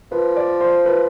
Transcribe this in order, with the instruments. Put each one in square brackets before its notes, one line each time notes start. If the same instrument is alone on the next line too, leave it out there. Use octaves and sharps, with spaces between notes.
[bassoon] F3 [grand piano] B4
[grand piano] D5
C5
B4